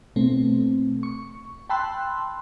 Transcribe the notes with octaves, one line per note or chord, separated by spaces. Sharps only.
B2 A3 C4
C#6
G5 A5 B5 C6 E6 F#6